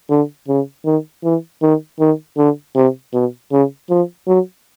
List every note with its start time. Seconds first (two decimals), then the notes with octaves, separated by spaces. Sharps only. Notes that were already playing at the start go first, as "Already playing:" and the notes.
0.10 D3
0.48 C#3
0.85 D#3
1.24 E3
1.62 D#3
2.00 D#3
2.38 D3
2.75 C3
3.14 B2
3.52 C#3
3.90 F3
4.27 F#3